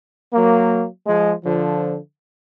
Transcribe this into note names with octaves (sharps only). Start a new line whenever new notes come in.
F#3 A#3
F3 G#3
D3 F3